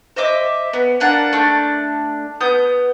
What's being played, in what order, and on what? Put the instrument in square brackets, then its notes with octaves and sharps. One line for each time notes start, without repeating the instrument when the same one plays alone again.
[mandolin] C5 D#5 E5 D6
B3
A#3 D4 F#5 A5
A3 D4
B3 D#6 G6